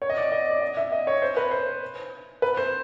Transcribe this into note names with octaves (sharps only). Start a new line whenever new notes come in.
C#5
D#5
D5
D#5
D5
D#5
E5
D#5
C#5
C5
B4
C5
B4
C5